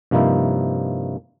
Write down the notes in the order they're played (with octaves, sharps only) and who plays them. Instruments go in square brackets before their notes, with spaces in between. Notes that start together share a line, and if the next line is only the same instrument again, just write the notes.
[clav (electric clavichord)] G2 C3 F3 A#3 D#4 E4